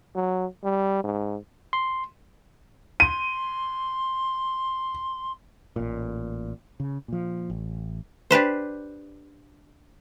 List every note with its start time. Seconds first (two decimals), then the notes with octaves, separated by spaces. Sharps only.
0.15 F#3
0.64 G3
1.04 G#2
1.73 C6
3.00 C6 D#7
5.76 A1 A#2
6.80 C#3
7.08 A#2 F3
7.50 A1
8.31 D4 G4 B4 C5